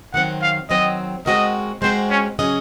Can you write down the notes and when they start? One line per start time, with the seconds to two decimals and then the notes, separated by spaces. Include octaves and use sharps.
0.14 D#3 F#3 C4 F#5
0.42 F5
0.69 D#3 F#3 C4 D#5
1.26 G#3 C4 F#4 A#4 D#5
1.82 G#3 C4 F#4 A#4 C5
2.10 C#4
2.39 C#3 F#3 C#4 G#4 D#5